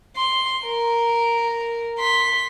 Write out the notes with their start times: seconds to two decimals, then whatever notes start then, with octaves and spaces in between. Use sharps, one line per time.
0.16 C6
0.67 A#4
1.99 C6 B6